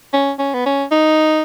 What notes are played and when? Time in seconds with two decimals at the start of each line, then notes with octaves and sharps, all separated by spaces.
0.13 C#4
0.39 C#4
0.54 B3
0.66 C#4
0.91 D#4